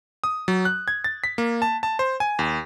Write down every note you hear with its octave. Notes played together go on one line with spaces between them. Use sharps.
D#6
F#3
F#6
G#6
A6
B6
A#3
A5
A5
C5
G#5
D#2